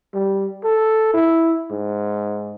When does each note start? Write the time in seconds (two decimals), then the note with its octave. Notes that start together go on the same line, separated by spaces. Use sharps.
0.14 G3
0.64 A4
1.14 E4
1.71 G#2